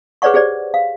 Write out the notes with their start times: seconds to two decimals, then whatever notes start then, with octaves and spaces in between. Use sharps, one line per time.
0.22 G#4 B4 C#5 D5 F#5 C#6
0.34 G4 G#4 C5 D5
0.74 F5